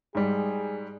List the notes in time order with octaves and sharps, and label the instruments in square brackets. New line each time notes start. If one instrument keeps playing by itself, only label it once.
[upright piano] G#2 G3 [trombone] G#4